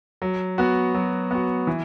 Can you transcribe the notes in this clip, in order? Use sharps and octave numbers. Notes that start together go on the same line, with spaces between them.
F#3
B3 F#4
F#3
B3 F#4
E3